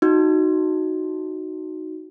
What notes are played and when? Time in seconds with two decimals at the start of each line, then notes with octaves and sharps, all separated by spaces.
0.02 D#4 F#4